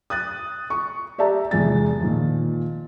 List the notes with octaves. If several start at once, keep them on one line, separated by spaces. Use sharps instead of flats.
D#6 F#6 A6
C#6
G4 D5 E5 A5 A#5
F1 E2 G#3 A6
A#2 D#3 F3